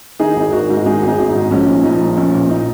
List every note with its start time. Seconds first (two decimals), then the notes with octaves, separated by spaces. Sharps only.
0.19 D#3 D#4 G#4
0.36 G#1
0.52 G#1 F#4 A#4
0.70 G#2
0.86 D#3 D#4 G#4
1.02 G#1 D#4 G#4
1.18 G#1
1.29 D#4
1.35 G#2
1.51 A#1 C#4
1.69 A#2
1.84 A#1 D#4
2.02 A#2
2.17 A#1 C#4
2.34 A#2
2.50 D#4